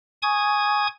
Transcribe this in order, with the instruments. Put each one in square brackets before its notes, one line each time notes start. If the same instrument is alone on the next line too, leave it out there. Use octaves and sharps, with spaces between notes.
[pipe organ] G#5 C#6 D#6 G#6